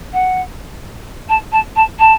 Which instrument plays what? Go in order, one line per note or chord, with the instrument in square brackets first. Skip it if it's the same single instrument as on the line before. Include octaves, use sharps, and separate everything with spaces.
[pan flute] F#5
A5
A5
A5
A5